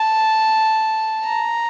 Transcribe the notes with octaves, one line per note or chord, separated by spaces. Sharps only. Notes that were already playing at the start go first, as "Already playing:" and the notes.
Already playing: A5
A#5